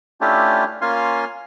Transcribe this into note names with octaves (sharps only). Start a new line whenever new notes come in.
A3 C#4 D4 E4 F4 G4
A#3 C#4 F4 F5 G#5 C6